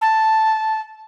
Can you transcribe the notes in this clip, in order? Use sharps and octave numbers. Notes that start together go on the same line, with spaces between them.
A5